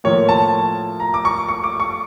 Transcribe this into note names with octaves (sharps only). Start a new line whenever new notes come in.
A2 F3 A#3 C#5
A5
A#5
D6
C#6
C#6
D6
C#6